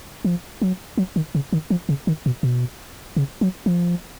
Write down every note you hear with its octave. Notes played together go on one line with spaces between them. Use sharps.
F3
F#3
F#3
D#3
C#3
D#3
F3
C#3
D#3
B2
B2
C#3
F#3
F3